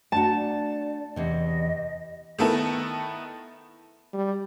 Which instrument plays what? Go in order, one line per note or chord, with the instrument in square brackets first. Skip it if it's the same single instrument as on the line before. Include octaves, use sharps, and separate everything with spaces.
[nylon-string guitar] A3 D4 F#4 [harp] A5
[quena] D5
[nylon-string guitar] E2 C3 [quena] D#5
[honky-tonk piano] D#3 A3 B3 E4 A4 A#4
[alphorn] G3